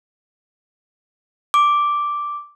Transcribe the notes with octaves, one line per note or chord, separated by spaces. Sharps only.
D6